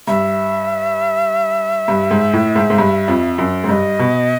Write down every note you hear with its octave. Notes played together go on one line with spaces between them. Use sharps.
G2 E5
G2
G#2
A2
G#2
G#2
G2
F2
F#2
G#2
G2 D#5
B2